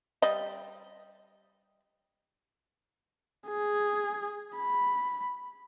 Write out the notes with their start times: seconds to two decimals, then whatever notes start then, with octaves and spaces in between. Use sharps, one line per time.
0.22 G3 D#5
3.48 G#4
4.57 B5